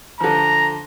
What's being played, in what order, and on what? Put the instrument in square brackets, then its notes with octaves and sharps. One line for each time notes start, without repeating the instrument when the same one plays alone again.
[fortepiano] D3 F3 [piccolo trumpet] A#5